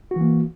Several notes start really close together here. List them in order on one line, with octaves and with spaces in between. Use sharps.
F#4 E3 A#3